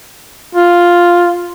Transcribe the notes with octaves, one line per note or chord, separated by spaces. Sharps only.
F4